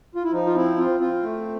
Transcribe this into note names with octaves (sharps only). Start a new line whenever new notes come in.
F4
E4
F3 D#4
F4
C4 E4
C4 F4
C4 F4
A3